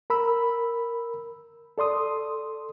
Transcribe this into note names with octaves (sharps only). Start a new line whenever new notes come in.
A#4 B5 E6
A4 D5 C6 D#6